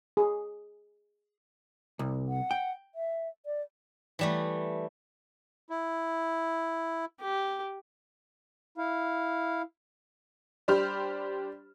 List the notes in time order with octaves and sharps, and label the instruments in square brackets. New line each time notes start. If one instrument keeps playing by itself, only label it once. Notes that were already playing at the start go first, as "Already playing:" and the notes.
[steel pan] G#4
[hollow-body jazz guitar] C2
[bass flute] F#5
[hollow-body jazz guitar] G5
[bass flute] E5
D5
[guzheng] E3 G3 A3
[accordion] E4
[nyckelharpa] G4
[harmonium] E4 F5
[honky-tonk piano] G3 D4 G4 C5 B5 F6